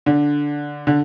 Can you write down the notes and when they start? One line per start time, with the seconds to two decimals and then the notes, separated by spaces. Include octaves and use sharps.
0.06 D3
0.87 D3